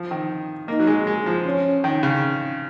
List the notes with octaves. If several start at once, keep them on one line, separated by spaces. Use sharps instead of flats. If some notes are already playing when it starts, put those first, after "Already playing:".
Already playing: F3
D#3
A#3 D#4
F#3
G#3
G#3
F3
C#4
D#3
C#3